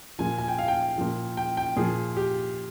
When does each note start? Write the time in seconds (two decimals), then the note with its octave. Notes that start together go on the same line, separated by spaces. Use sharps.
0.19 A#2 F3 G#5
0.38 G#5
0.48 G5
0.59 F5
0.68 G5
0.98 A#2 F3
1.37 G5
1.57 G5
1.77 A#2 F3 G#4
2.17 G4